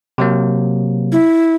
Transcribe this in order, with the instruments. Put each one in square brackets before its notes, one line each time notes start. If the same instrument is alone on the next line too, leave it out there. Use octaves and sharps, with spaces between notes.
[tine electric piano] C3 F#3 A#3
[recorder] E4